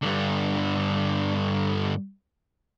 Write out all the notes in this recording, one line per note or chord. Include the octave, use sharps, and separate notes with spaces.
G2 D3